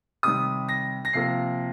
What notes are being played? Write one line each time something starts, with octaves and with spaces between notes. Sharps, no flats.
C3 D#3 G3 D#6
A#6
A#6
C3 F3 A#3 C7